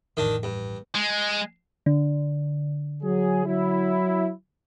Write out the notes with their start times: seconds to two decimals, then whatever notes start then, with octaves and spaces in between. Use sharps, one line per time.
0.17 A1 F2 D#3 D4
0.43 G2
0.95 G#3
1.86 D3
3.01 F#3 G#4
3.44 F#3 E4